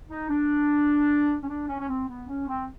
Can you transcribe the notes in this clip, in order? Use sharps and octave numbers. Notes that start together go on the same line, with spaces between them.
D#4
D4
C#4
D4
C#4
C#4
C4
B3
C#4
C4